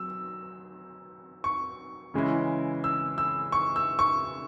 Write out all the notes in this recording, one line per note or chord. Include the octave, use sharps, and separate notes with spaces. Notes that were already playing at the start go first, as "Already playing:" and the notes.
Already playing: F#3 E6
C#6
C#3 E3 G#3 C#4 E4
E6
E6
C#6
E6
C#6